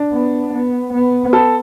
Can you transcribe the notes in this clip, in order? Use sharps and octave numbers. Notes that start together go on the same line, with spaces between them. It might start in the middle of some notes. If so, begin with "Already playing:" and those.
Already playing: D4
B3
B3
B3
A4